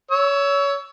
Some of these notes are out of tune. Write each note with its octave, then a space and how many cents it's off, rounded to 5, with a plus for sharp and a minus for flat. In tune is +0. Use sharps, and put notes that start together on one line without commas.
C#5 +25 E6 +0